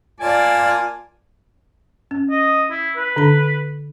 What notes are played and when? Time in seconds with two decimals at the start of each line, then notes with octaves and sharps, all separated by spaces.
0.20 A#3 F4 D5 G#5 A5
2.11 C#4
2.31 D#5
2.71 E4
2.97 B4
3.16 D3 D4 B5